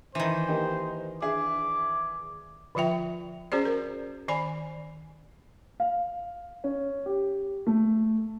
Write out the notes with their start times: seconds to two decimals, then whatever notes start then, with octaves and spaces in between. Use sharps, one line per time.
0.15 D#3 E3 C5
0.48 A#3 D#4 G4
1.22 D4 G#4 E5 D6
2.75 D3 F3 F4 E5 G5
3.52 C#4 F#4 G#4 C5 D5
3.65 A#4
4.28 D#3 D5 G#5 B5
5.80 F5
6.64 C#4
7.06 G4
7.67 A3